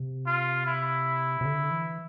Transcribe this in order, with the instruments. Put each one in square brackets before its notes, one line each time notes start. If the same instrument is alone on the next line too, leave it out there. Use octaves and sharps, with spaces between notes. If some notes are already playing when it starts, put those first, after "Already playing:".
Already playing: [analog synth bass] C3
[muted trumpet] F4
E4
[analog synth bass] C3
D3
E3